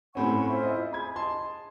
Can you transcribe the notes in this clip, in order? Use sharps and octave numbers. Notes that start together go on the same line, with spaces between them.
A2 C4 C#4 F#5 B5 C#6
E4 F4 C5
D#5
G#4 B5 G#6
D#5 A5 C6